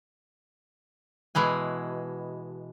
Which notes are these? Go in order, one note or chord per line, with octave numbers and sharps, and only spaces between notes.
B2 E3 G#3 G#5